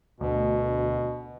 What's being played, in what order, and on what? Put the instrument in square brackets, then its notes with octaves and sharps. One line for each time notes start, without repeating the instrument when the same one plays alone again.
[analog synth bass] D2 [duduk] B2